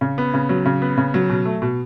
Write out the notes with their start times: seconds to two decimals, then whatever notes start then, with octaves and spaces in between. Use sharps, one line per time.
0.01 C#3
0.18 B3
0.34 C#3
0.49 F#3
0.65 C#3
0.82 B3
0.97 C#3
1.14 F#3
1.29 B2
1.45 A3
1.62 B2